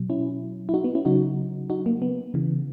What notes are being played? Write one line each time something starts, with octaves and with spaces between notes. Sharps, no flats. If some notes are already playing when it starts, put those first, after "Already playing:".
Already playing: B2 F#3
C#4 E4
E4
D#4 F#4
B3
C#4 E4
C#3 F#3 D#4 F#4
D#4 F#4
A#3
B3
C#3 E3